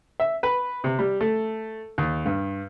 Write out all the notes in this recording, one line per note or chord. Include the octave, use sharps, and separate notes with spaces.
E5
B4
C3
G3
A3
D#2
G2